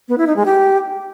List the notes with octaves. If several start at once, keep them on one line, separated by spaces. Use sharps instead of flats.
B3
E4
D#4
G#3
G4